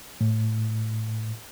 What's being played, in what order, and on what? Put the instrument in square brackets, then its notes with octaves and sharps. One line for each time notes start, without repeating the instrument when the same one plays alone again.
[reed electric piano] A2